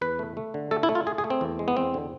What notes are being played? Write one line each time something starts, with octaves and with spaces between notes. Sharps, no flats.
E2 B4
A3
A3
D3
A3 A4
E4
A3
F4
A3 G#4
G#4
A3
C4
E2
G#3
B3
E2 C4
D3